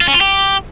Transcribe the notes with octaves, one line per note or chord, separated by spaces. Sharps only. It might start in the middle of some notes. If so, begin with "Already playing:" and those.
F4
C#4
F4
G4